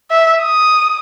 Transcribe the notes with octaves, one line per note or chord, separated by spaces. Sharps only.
E5
D#6